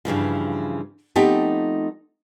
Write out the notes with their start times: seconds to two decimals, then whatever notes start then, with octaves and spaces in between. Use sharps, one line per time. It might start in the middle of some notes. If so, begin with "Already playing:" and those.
0.05 G2 C#3 E3 F3
1.16 F3 A3 B3 C4 D#4 G4